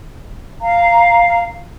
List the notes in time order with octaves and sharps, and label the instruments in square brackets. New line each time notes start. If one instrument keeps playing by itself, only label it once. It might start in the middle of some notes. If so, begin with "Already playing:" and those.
[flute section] F5 A#5